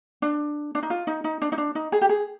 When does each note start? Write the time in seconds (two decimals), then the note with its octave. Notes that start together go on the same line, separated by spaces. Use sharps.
0.22 D4
0.75 D4
0.83 D#4
0.90 F4
1.07 D#4
1.24 D#4
1.42 D4
1.52 D#4
1.58 D4
1.75 D#4
1.92 G#4
2.01 G4
2.09 G#4